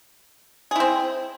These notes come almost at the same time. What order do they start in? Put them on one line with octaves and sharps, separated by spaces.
G#4 E4 C4